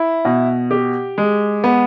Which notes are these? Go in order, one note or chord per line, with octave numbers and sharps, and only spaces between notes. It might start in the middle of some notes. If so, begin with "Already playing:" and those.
Already playing: E4
B2
G4
G#3
B3